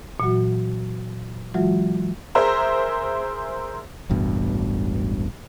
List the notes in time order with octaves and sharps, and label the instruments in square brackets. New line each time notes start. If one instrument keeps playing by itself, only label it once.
[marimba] A#2 E3 F#3 F#4
E3 F#3 G#3 F4 F#4
[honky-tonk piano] G#4 A#4 C5 E5 A#5
[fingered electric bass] E1 A1 G2 B2